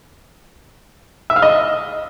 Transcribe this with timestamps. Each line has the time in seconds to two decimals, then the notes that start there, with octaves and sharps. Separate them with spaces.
1.30 E5
1.36 F5
1.42 D#5